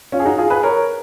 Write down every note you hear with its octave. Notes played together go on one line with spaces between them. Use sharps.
C#4 F4
G#4
D#4 F#4
F4 G#4
G#4 B4
A#4 C#5